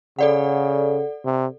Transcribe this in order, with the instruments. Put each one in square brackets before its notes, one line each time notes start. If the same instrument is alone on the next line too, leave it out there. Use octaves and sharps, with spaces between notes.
[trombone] C#3 [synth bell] A4 D5 F#5
[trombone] C3